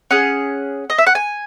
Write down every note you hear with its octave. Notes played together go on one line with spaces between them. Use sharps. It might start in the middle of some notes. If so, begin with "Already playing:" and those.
C#4 G#4 F#5
D#5
E5
F#5
G#5